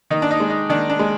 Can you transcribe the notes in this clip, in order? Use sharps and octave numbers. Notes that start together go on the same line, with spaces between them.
D#3 D#4
D4
D#4
G#3
D#4
D#3 D4
D4
G#3